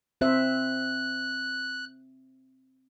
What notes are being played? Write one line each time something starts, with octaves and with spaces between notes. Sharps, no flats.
C4 C5 E5 F#6